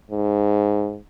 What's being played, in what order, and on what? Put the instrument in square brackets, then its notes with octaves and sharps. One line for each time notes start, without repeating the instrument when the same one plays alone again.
[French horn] G#2